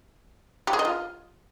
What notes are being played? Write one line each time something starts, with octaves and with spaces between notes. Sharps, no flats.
G4
G#4
D#5
F4